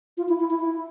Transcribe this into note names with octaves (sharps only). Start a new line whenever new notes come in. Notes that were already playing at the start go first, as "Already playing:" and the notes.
F4
E4
E4
E4
E4